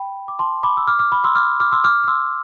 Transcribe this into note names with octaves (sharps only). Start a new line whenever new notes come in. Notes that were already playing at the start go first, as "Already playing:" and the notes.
Already playing: G5 B5
D6
A5 C6
B5 D6
E6
D6 F6
D6 F6
B5 D6
C6 E6
D6 F6
D6 F6
C6 E6
D6 F6
F6
C6 E6